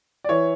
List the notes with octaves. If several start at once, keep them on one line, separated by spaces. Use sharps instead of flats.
D5
E3 C#5